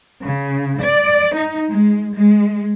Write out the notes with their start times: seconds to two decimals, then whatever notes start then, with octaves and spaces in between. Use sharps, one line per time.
0.24 C#3
0.81 D5
1.36 D#4
1.70 G#3
2.15 G#3